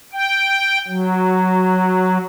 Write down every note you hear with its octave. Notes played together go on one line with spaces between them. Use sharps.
G5
F#3